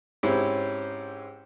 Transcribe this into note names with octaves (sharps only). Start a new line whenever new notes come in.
G#2 C4 C#4 E4 G4